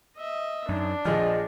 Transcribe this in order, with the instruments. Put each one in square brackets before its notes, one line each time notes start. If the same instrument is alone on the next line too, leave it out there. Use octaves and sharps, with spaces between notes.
[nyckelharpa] D#5 E5
[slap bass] F#2 [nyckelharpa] D4 [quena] D#4
[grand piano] A#1 G#4 F6 [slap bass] F3 [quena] D#5